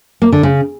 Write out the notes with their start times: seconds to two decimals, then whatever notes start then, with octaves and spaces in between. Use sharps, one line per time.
0.22 A#3
0.32 D3
0.43 C#3